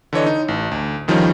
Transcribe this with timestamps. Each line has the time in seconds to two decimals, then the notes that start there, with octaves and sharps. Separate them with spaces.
0.13 D3 E3 C#5 D#5
0.26 D#4
0.48 A1
0.72 D2
1.08 F2 D#3 F3 G3 C#4 D#4